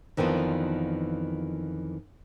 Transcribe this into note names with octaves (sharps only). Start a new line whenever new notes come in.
F2 D#3 E3 B3 D4 F4